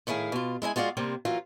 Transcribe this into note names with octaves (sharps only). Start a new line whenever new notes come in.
A2 D#3 E4 G#4 F5
B2 F4
G#3 E4 D#5 G#5
G#3 F4 F#4 D5 F5
C3 G3 A#3 C4
E3 F#3 A#3 F4